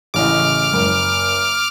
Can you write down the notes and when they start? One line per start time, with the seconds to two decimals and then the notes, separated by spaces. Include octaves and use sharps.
0.14 A1 C#3 D#5 D6 F6
0.73 F#1